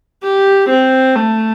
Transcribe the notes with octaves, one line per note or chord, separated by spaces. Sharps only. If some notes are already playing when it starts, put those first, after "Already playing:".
G4
C4
A3